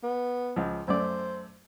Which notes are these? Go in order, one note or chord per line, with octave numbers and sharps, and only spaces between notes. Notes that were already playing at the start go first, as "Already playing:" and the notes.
B3
C#2 F3
F#2 A3 C5 D5